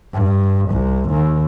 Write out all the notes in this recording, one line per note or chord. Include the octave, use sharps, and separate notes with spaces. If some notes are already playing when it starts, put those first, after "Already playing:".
G2
C2
D#2